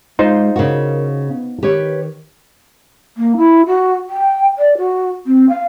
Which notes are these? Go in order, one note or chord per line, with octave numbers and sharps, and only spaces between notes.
G#3 D#4 F4 C5
C#3 F#4 A#4
B3
D#3 G4 B4 C#5
A#3
E4
F#4
G5
D5
F#4
C4
F5